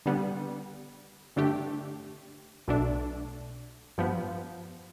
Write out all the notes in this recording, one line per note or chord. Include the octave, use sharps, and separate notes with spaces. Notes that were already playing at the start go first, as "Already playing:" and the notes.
D3 G3 B3
G2 D3 A3 D4 G4
B1 B2 A3 D4
G2 F3 B3